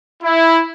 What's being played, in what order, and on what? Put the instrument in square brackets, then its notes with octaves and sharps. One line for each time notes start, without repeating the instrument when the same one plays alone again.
[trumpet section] E4